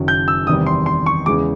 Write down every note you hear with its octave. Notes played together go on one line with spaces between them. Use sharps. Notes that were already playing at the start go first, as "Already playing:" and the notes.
Already playing: F#1 F#2 D#3 F#3
G6
E6
E2 C3 D#3 G3 D#6
C6
C6
C#6
E2 C#3 E3 G#3 D6